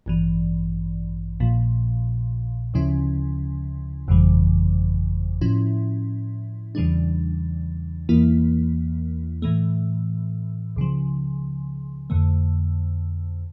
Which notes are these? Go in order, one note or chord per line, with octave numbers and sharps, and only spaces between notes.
A1 G2 E3
A#1 A#2 F3
D2 C#3 F3 C#4 E4
G1 F2 C#3 E3 G3
A2 F3 C#4 E4
E2 C#3 E3 G3 D4
E2 E3 A#3 E4
A2 E3 A3
C#2 C#3 F3
F2 D3 A3